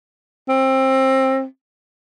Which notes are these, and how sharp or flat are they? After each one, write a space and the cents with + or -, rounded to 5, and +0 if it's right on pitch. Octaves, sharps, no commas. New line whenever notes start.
C4 +20